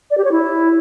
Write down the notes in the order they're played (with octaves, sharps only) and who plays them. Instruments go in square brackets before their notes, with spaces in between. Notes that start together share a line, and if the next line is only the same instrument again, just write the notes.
[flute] D5
G4
C#5
E4